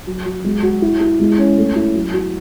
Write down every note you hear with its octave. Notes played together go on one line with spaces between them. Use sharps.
F#3
F#3
G#3
F#4
E4
E4
G#3
C#4
A3
E4
F#3
F#4